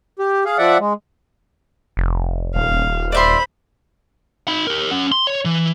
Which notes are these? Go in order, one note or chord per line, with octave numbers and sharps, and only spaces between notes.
G4
G#4 F5
F3 D5 E5 F#5
G#3
F1
D#1 F5
C5 D5 E5 B5 C6
D#4 B5
G4 A#4
C#4 F#5
C6
C#5
E3